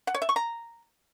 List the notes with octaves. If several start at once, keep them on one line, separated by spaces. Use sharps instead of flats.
F#5
C#5
E5
C#6
A#5